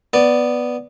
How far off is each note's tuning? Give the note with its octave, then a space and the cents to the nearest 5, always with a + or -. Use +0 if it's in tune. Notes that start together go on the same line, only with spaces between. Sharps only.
B3 +0 D5 +0